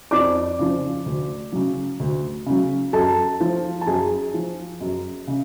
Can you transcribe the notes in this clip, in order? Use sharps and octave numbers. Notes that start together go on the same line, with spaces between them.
F2 D5 D6
C#3 F3
D2
C#3 F#3
D2
C#3 F#3
F#2 A4 A5
F3
A5
F#2 G#4 G#5
F3
F#2
C#3